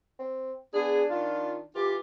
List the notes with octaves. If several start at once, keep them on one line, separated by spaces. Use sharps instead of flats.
C4
B3 D4 G#4
D#3 F4
E3 F4 G4